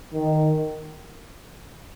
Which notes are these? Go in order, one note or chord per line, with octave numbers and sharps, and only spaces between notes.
D#3